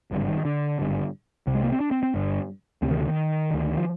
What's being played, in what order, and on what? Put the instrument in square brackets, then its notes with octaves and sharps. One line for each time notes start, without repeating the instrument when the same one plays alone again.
[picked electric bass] G#1 G2 D3
D3
D#3
D3
G#1 G2 D3
C2 C3
G#3
A#3
C4
D4
C4
C4
G1 G2 D3
D2 C3 C4
D#3
D3
D#3
D2 D3
F3